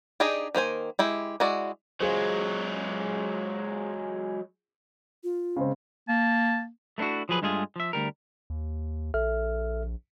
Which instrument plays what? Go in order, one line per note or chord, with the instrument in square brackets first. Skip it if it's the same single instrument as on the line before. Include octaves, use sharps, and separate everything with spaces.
[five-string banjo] D4 D#4 G4 G#4 D#5
D#3 A#3 C5 G#5
G#3 E4 G4
G#3 E4 F#4 D5
[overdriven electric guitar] F#3 G#3 [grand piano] F4 G#4 C5
[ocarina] F4
[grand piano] C#3 G#3 C4
[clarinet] A#3 [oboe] A5
[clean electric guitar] A3 B3 D4 E4 F#4
F3 F#3 G#4 B4
G2 G#3 A3 F4 G#4
F3 E5
D2 G3 A#4
[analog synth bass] D#2
[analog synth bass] A#1 [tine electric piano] A4 E5 F6